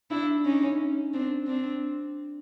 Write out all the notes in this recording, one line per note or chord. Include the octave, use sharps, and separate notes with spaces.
D4 E4
C#4 D#4
C4 D4
C4 D4